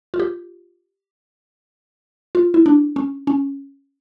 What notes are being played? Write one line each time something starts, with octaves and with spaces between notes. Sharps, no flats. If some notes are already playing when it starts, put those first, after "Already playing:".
F4
G4
F4
E4
D4
C#4
C#4